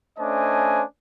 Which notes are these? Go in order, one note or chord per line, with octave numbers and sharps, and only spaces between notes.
A3 C#4 D4 C5 D#5 G#5